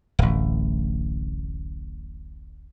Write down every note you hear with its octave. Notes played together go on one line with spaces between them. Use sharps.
D1 A1